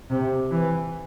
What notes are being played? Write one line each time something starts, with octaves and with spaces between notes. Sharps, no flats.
C3
E3